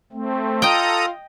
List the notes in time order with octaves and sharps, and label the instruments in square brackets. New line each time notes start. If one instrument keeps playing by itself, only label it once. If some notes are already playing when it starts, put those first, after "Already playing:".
[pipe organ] A3 C4
[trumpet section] F4 [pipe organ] A4 A#5 D#6 [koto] D#5 G5